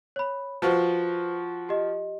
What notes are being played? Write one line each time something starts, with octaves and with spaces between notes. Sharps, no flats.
C#5 B5
F3 F4 F#4 B4 C5
G4 D#5